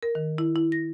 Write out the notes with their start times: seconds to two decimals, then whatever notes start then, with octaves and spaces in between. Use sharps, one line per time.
0.03 A#4
0.15 D#3
0.38 E4
0.56 E4
0.72 A#6